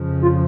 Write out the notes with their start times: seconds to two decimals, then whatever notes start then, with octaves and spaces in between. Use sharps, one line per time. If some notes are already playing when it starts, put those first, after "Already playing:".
Already playing: F2 C#3 F3
0.22 F4